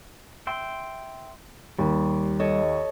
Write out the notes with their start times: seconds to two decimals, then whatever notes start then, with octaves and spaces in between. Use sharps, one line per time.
0.47 E5 G5 C6
1.78 D#2 G3
2.40 A4 C#5 D#5